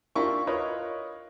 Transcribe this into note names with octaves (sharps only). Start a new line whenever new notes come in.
D4 E4 F4 G4 A#4 C#6
F4 A#4 B4 C#5 D#5